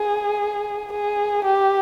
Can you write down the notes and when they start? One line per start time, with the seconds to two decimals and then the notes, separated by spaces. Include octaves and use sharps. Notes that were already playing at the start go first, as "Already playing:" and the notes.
Already playing: G#4
0.92 G#4
1.44 G4